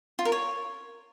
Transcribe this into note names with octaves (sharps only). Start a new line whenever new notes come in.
F4
A#4
C#5